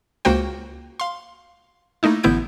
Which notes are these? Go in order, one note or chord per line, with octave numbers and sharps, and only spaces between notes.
C#2 A#3 F#4 C5 G5
F5 C6
A3 A#3 D#4 E4
A1 D3 B3 E4 G6 D7